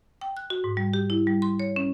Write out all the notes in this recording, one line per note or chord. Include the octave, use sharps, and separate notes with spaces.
G5
F#6
F#4
G#2
G3
G4
E4
G3
C6
C#5
C#4